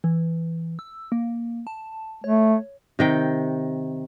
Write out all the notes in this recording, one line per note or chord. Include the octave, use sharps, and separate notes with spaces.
E3
E6
A#3
A5
A3 C#5
C3 D#3 G5